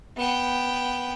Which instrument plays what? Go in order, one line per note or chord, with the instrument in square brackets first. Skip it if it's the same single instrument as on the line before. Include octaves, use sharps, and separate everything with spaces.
[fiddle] B3 G5